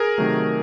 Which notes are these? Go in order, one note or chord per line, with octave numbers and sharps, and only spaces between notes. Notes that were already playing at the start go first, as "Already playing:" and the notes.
Already playing: G#4 A#4
C3 D#3 F#3 A3